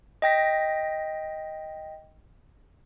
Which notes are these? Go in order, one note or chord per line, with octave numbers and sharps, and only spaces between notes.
D#5 G5 A#6 B6